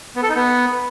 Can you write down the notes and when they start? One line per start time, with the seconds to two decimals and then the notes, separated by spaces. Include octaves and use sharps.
0.16 B3
0.23 A4
0.29 D#4
0.36 B3